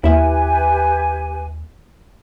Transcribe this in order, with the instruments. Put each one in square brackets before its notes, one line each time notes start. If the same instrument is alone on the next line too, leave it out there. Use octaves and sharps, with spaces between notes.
[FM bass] D#2 [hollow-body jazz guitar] E4 E5 [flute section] G4 B4 G#5